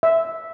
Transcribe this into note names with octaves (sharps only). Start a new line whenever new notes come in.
E5